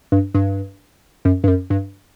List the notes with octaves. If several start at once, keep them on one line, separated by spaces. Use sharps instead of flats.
G2
G2
F#2
G2
F#2
G2